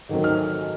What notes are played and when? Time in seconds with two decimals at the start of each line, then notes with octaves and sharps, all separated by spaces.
0.09 G#2 D#3 F#3 A3 C4
0.24 F6